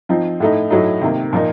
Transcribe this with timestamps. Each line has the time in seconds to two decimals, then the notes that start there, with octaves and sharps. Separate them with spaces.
0.09 F3 C4 D#4
0.40 A2 A3 D#4
0.70 A2 F#3 A3 D#4
1.01 C3 D#3 A#3
1.33 A#2 F3 A#3 D#4